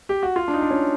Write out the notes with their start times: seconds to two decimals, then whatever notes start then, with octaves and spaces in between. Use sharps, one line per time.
0.09 G4
0.23 F#4
0.36 F4
0.48 D4
0.54 D#4
0.62 D4
0.70 C#4